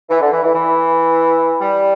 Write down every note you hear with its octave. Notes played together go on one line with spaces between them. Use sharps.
E3
D3
E3
E3
E3
G3